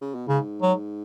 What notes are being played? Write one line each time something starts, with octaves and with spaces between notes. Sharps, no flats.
C#3
B2
G#2 C#3
F#3